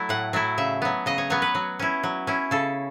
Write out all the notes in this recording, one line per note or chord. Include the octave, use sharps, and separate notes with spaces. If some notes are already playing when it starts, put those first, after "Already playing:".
Already playing: F#3 A3 E4
A2 F#5
F#3 A3 E4
C#3 E5
F#3 B3
C#3 D#5
C#5
F#3 B3 C#5
B4
F#3
C#4 E4
F#3
C#4 E4
C#3 A4